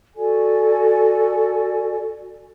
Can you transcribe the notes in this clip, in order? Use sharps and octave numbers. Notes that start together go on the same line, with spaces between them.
F#4 A4 D5 G#5